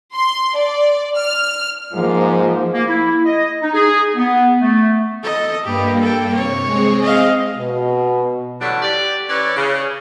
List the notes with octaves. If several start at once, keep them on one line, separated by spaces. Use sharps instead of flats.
C6
D5
F6
G#2 F3 A#3
A#3
E4
D#5
D#4
G#4
B3
A3
A4 D#5
G2 A#3 G4 B4
A4 G5
C3 C#5
G#3 C4 G#4
D#5 F5
B2
D3 E3 F#3 G3 A3 D4
G4 D5
E3 C#4 B4 C#5 D5
C#3